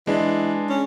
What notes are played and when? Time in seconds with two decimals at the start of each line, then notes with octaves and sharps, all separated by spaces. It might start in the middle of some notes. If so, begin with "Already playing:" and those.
0.07 E3 G#3 D4
0.69 C#4